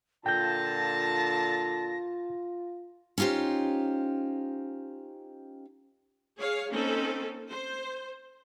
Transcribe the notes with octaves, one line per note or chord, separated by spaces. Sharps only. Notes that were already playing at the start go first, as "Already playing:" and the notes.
A#2 D3 F4 G5 A5 G6 A#6
C#4 D#4 F4 G4 C5
G#4 C#5 F5
A#3 C4 C#4 D#4 A4
C5